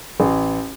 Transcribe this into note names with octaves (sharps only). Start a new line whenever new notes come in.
A1